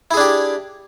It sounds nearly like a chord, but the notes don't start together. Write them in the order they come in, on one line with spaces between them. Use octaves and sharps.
E4 G#4 D4 G4